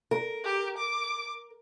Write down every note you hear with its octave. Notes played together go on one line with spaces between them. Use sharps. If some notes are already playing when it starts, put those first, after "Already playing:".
A#4
G4
D6